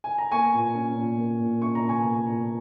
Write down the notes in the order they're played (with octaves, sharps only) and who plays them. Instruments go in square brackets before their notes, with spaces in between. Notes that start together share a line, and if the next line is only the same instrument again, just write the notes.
[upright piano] G#5
A#5
A#3 G#5 C#6
A#2
C#4
A#2
A#3
A#2
C#4 C#6
A#5
A#2
G#5 C#6
A#3
A#2